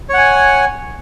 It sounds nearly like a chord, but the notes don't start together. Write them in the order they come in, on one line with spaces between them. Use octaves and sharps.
C#5 F#5 G#5